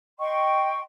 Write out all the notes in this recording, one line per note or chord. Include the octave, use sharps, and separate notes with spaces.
D#5 G5 C6 C#6